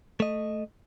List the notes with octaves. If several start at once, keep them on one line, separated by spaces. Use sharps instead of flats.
A3 D#5